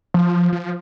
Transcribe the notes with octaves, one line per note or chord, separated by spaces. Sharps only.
F3
F3